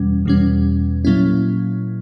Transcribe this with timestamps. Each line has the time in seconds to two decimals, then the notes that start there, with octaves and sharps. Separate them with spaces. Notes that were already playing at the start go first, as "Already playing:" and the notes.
Already playing: E2 B2 G3 C#4
0.26 E2 B2 G3 C#4
1.05 A#2 F#3 A#3 C#4 E4